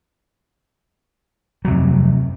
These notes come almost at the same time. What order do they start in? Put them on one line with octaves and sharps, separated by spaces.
F#3 C3 F2